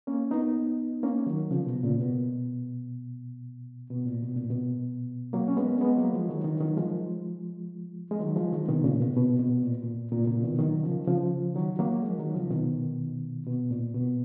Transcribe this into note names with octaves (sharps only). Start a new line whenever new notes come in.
A#3 C#4
B3 D#4
A#3 C#4
D#3 F#3
C#3 F3
B2
A#2 C#3
B2
B2
A#2
B2
A#2
B2
F#3 A#3
C#4
G#3 B3
C#4
G#3 B3
F#3 A#3
F3 G#3
D#3 F#3
D#3 F#3
D#3 F#3
F3 G#3
G#3
D#3 F#3
F3 G#3
D#3 F#3
B2 D#3
A#2 C#3
B2
B2
B2
A#2
A#2
A#2
A#2 C#3
B2 D#3
D#3 F#3
C#3 F3
C#3 F3
D#3 F#3
F#3 A#3
F3 G#3
D#3 F#3
C#3 F3
B2 D#3
B2
A#2
B2